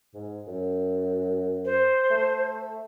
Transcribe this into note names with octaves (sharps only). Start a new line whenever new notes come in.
G#2
F#2
C5
A3